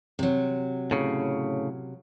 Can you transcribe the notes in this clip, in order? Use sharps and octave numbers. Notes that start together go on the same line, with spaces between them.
C3 F#3
A2 C#3